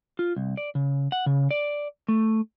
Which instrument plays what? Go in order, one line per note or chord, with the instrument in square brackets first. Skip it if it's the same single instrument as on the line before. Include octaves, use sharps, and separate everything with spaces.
[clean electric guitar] F4
C2
D5
C#3
F#5
C#3
D5
A3